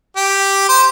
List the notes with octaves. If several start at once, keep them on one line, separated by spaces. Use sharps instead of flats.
G4
C5